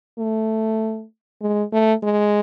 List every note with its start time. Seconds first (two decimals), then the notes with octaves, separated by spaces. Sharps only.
0.18 A3
1.41 G#3
1.72 A3
2.03 G#3